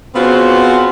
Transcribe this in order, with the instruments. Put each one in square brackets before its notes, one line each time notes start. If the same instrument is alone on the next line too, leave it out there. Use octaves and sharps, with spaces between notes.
[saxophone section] C#3 B3 C4 F4 F#4 C5